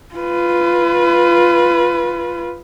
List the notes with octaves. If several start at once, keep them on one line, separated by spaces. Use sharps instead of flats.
F4 B4